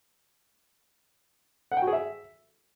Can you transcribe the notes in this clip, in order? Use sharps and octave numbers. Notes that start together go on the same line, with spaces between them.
F#5
G5
F#4
G#4
E5